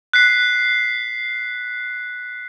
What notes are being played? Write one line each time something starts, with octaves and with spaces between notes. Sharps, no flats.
F#6 B6 C7